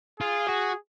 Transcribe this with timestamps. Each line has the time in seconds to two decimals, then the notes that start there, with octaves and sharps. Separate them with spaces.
0.20 F4 G#4
0.47 F#4